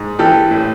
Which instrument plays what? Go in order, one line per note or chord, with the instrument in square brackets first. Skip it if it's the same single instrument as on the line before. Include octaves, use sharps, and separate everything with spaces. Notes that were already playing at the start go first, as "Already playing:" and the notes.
Already playing: [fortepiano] G#2
E3 G4 A4
A2